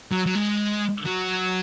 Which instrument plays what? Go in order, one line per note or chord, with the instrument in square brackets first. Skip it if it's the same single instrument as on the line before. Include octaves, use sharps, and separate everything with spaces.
[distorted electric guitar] F#3
F#3
G#3
F#3